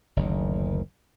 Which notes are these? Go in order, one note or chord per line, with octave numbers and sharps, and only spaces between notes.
F#1 D2 D#3